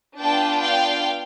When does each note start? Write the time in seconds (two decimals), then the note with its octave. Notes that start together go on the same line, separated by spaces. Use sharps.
0.20 B3 D4 F4 G5 A5
0.62 F5 G5